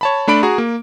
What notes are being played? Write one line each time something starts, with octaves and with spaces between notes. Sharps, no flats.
C#5 A5 B5
A3 D4 B5 D7
F#4 G#4 A#5
A#3